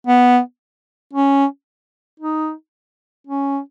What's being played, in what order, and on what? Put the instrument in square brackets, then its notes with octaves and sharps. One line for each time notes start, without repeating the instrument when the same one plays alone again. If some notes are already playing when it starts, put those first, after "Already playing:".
[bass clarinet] B3
C#4
D#4
C#4